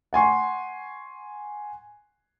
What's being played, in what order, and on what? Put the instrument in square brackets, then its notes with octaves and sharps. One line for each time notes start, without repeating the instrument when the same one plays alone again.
[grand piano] F#5 G#5 C6 C#6